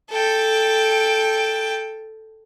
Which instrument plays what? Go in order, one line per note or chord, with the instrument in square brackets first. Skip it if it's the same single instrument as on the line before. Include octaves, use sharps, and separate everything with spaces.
[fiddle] A4 G5